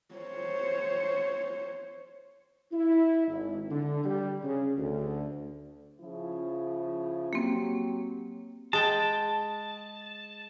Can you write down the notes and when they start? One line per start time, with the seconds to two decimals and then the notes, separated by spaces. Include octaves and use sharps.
0.15 C5 C#5
2.72 E4
3.28 G#1
3.70 D3
4.04 G3
4.43 C#3
4.77 D2
6.01 C#3 F3 E4
7.33 F#3 A#3 C4 G4
8.73 G#3 G5 A5